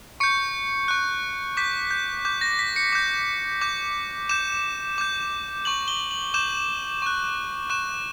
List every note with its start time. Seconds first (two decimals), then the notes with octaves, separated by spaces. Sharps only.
0.20 C#6 G6 C#7
0.88 C#6 F#6
1.57 D6 G6 B6
1.91 G6
2.25 D6 G6
2.41 A#6
2.59 B6
2.76 C#7
2.92 D6 G6
3.61 D6 G6
4.29 D6 G6 E7
4.98 D6 G6
5.65 C#6 G6 F#7
5.88 G7
6.11 F#7
6.34 D6 G6 E7
7.02 C#6 F#6
7.70 C#6 F#6 E7